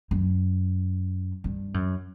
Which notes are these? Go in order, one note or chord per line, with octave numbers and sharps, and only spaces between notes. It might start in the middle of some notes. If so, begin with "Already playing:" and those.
F#2
G2
F#2